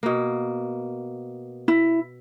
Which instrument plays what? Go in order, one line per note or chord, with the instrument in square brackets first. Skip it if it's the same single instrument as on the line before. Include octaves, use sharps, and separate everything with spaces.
[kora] B2 A#3
[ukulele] E4